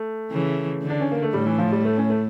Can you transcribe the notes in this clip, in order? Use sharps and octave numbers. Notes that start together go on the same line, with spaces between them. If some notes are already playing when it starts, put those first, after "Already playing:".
Already playing: A3
C#3 E3
D3
D4
C#4
A#3
A3
A2 G3
E3
F3
G3
A3
C#4
A3